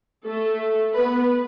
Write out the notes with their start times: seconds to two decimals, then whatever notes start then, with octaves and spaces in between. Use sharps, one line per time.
0.25 A3 A4
0.94 B3 B4